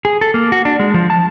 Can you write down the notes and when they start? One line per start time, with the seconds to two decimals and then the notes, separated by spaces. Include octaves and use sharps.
0.05 G#4
0.21 A4
0.34 A#3
0.52 F#4
0.65 D4
0.80 G#3
0.94 F3
1.10 A5